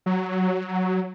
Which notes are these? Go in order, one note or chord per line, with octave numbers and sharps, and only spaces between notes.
F#3